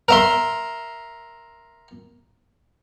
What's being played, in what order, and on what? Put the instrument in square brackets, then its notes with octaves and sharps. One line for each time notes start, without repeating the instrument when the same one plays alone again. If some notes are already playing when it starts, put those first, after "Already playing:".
[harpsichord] A#4 E5 C6